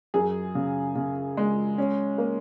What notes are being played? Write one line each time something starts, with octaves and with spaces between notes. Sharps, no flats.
F#2 G#4
C#3
C#3
G#3
C#4
A#3